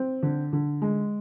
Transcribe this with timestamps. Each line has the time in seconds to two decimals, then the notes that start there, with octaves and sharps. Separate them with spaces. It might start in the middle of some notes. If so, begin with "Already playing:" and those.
Already playing: C4
0.23 D3
0.53 D3
0.82 G#3